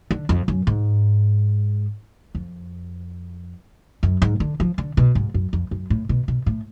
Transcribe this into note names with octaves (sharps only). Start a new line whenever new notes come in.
D3
F2
F#2
G#2
F2
F#2
G#2
D3
F3
D3
B2
G#2
F#2
F2
F#2
A2
B2
B2
A2